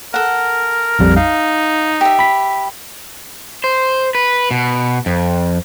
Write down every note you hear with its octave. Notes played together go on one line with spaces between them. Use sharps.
A4 A#4 F#5
A#1 F2 G3
D#4 F5
G4 E5
B5 B6
C5
B4
B2
F2